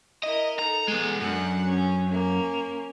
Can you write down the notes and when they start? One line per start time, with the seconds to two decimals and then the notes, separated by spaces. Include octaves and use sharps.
0.24 E4 A#4 D#5
0.59 D#4 A4 A#5
0.88 G#3 B3
1.20 F#2 D4 F#5
1.67 C#4
2.08 A#3 C#4